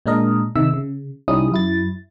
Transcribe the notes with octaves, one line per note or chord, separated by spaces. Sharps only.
A#2 G#3 D4 A#4 D#5
C3 D#3 D#4 E5 E6
C#3
C2 G3 C#4 D#4 E4 D#6
F#2 E4 A6